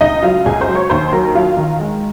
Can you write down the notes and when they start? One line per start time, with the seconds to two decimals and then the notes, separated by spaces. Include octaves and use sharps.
0.01 C#2 D#4 D#5
0.23 F#3 F4 F5
0.46 C#2 G#4 G#5
0.61 C5 C6
0.68 F#3
0.75 C#5 C#6
0.90 D#2 C5 C6
1.13 F#3 A#4 A#5
1.35 F#3 F4 F5
1.57 D#3
1.80 G#3